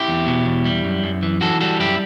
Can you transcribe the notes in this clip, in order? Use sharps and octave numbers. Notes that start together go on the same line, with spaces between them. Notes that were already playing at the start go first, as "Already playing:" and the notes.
Already playing: E4 G4
E2
B2
E2
G3
F#2
F#2
E3
E3 F#4 A4
G3 F#4 A4
F#2 E4 G4